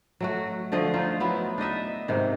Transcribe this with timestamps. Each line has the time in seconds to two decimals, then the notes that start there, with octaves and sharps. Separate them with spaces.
0.20 F#3 A3 F#4
0.72 D3 F3 A3 D#5
0.94 D#4 F4 C5
1.20 F#3 B3 E4
1.58 D4 D#4 D#5 E5
2.08 G#2 C3 D#3